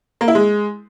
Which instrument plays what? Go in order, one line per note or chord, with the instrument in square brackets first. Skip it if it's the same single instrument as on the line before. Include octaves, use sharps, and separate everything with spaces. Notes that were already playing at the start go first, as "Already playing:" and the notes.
[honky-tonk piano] A#3
E4
G#3